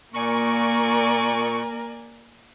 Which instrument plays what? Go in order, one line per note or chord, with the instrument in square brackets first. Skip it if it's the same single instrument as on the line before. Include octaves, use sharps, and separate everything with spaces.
[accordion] A#2 C#6 [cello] A#3 A#4 [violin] D5 G#5